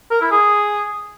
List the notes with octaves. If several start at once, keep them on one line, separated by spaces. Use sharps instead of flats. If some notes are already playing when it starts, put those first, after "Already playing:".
A#4
E4
G#4